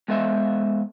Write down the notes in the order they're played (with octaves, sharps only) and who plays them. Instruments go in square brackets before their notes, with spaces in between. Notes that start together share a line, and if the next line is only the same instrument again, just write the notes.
[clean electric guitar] G#3 B3 A4 C5 D#5 E5